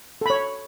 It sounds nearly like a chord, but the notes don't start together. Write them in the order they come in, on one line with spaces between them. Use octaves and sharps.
A4 B5 C#5